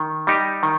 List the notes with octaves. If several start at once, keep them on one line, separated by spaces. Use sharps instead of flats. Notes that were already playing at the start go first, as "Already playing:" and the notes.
Already playing: D#3
G3 D#4 G4
D#3